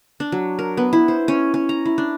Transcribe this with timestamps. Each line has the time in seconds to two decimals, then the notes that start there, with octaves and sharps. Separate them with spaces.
0.20 D4
0.32 F#3
0.59 A#4
0.77 B3
0.93 E4
1.08 C5
1.28 C#4
1.54 C#4
1.69 A#5
1.85 E4
1.98 D4